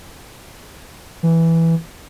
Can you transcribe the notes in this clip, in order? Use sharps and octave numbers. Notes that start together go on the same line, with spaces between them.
E3